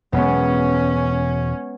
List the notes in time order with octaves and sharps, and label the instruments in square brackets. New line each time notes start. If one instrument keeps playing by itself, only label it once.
[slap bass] E1 [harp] G#3 B3 [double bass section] C#4